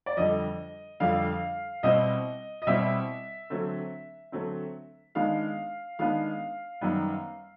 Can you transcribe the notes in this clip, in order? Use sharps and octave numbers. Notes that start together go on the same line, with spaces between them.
D5
F2 D3 G3 D#5
F2 D3 G3 F5
B2 G3 C4 E4 D#5
D#5
B2 G3 C4 E4 E5
D3 F#3 A3 C4
D3 F#3 A3 C4
D#3 G#3 B3 D4 F5
D#3 G#3 B3 D4 F5
F#2 D#3 G3 B3